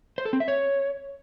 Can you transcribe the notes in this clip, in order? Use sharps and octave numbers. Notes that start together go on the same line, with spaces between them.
C5
A4
C4
E5
C#5